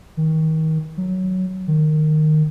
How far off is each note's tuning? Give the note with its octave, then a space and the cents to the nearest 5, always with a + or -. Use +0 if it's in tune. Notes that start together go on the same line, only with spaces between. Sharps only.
D#3 +30
F#3 +5
D#3 -15